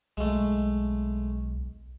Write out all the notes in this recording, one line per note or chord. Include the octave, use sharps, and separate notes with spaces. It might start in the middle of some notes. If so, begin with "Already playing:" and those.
B1 G#3 A3